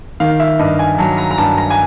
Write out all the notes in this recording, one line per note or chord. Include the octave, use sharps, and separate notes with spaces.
D#3 F5
E5
G2 D#5
G#5
F#3 A5
A#5
A#5
G2 A5
A#5
G#5